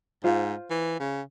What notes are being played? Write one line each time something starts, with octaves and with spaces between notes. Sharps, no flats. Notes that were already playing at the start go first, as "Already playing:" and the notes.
G#2 F4 C5 F5
E3
C#3